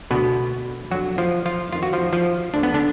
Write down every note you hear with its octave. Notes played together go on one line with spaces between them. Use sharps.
D2 B2 D3 B3
F2 D3 F#3 F#4
F3 F4
F3 F4
F2 D#3 F4
F#4
F3 F4
F3 F4
D2 D3 D4
B3
D3 D4